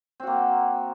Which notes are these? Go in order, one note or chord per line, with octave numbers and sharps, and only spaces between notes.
A#3 C4 F#4